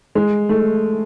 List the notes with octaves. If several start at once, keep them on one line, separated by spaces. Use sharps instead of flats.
G#3
A3